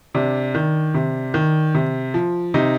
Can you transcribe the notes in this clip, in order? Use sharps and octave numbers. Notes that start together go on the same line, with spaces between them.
C3 D4
D#3
C3
D#3
C3
F3
C3 D#4